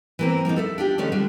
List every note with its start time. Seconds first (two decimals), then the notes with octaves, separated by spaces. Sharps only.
0.19 E3 A#3 C4
0.45 F3 A#3 C4 D#4
0.56 A4 D5 E5
0.78 D4 F4 G4
0.98 D3 A3 C#4 D#4 D5
1.12 D3 G3 D4 F4